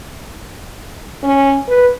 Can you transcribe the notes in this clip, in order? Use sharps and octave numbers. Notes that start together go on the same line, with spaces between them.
C#4
B4